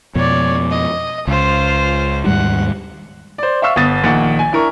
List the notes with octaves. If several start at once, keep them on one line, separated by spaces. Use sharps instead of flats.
F2 B2 C#5 D5
D#5
C#2 F4 C5
D#2 G#2 G3 F#5
C5 D5
E5 F5 C#6 E6
G1 B3 D#6 A6
A#1 D#3 F#5 A6
G#5
D4 E4 A#4 C#6